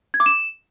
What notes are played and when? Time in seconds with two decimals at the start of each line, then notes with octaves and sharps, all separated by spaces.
0.14 G#6
0.20 D6
0.26 E7